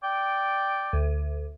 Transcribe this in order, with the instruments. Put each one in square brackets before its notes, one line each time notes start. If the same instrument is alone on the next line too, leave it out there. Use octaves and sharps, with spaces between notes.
[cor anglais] D5 [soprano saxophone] G5
[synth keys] D2